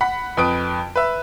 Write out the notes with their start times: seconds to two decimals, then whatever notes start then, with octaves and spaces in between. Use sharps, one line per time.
0.01 F#5 B5 B6
0.37 F2 B4 D#6 D7
0.96 B4 E5